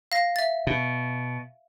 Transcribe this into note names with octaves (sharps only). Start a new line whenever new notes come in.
F5 A#6
E5 A6
B2